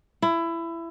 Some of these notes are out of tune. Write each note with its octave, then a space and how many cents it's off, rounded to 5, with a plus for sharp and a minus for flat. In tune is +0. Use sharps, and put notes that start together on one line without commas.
E4 +20